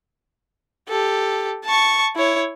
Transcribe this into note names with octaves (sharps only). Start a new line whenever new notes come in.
G4 A4
A5 C#6
E4 C#5